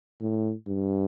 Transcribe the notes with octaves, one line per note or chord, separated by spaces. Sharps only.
A2
G2